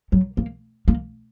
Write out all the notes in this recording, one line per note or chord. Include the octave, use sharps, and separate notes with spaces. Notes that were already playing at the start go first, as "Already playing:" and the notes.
F#3
A#3
A#3